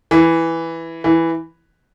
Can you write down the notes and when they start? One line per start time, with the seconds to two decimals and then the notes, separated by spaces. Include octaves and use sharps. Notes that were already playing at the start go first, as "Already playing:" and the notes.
0.11 E3
1.04 E3